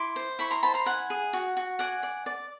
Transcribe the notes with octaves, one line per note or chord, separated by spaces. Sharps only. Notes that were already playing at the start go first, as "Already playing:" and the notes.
Already playing: E4 C6 D6
C5
E4 B5 C#6
A#5 C6
C5 A5 B5
A#5 C6
E4 F#5 G#5
G#4
F#4
F#4
D5 F#5 G#5
D5
D5